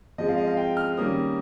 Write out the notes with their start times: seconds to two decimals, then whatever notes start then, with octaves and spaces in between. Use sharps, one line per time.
0.18 F3 G#3 C4 D#5
0.29 F5
0.37 D#5
0.47 F5
0.57 G5
0.77 F6
0.97 D#3 G3 A#3 C#4 D#6